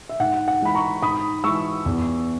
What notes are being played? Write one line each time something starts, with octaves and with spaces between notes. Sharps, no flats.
E5
G#2 F#5
F#5
E3 G#3 B5
A#5 C#6
G#2 B5 D#6
E3 G#3 C#6 E6
E2